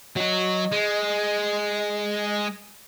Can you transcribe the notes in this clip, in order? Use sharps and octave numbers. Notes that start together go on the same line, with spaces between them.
F#3 F#4 D#5
G#3